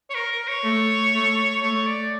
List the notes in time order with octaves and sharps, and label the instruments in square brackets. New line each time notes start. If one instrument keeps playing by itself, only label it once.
[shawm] C#5
A#4
A#4
C#5
[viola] A3
A3
[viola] A3 [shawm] C#5
[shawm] D5